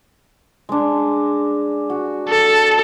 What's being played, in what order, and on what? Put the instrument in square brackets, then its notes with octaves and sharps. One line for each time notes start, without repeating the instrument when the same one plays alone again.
[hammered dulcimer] G#3 D4
F#4
[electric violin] A4